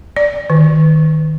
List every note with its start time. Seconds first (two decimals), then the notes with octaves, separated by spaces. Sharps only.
0.16 D5
0.50 D#3